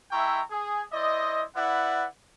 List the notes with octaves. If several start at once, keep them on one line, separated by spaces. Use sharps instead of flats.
G#3 E4 E5 G5 A#5 C#6
G#4
E4 C5 D5 D#5
E4 B4 D5 F#5